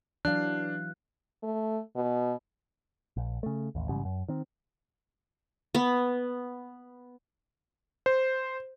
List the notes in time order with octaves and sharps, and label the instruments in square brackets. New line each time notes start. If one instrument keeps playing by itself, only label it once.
[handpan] E3 F#3 F5 [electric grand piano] D4 [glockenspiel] F#6
[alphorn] A3
B2
[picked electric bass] A#1
C#3 A3
A1 D#2
A1 G#2 C#3 G3
F#2
D#3 C4
[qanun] B3
[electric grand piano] C5